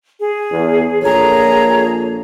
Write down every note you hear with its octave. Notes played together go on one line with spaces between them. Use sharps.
G#4
E2
A#1 A#2 G#4 A4 C#5 A#5